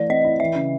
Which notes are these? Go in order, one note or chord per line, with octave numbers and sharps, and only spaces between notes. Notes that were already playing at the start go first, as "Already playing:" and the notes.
Already playing: E3 A3 D5
C4 D#5
E4
E3 E5
C#3